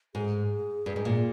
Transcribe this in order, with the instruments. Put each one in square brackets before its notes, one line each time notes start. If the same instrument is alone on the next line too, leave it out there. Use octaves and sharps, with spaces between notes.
[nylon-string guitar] G#2 [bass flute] G#4
[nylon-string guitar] G2
G#2
A#2